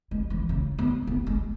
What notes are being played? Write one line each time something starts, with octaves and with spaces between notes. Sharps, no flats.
G#3
E3
C#3
B3
B3
G#3